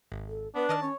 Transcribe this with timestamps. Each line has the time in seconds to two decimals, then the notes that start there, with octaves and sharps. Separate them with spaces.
0.12 G#1
0.28 A4
0.55 B3 D4 B4
0.69 D#3 D#5 A5 F6
0.82 C#4 C#5